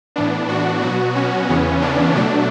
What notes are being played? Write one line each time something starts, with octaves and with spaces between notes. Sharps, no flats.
A2 E3 B3 D4
F#4
B2 F#3 B3 F#4
C#4
E2 C#3 E3 B3 C#4
D4
B2 F#3 A3 D4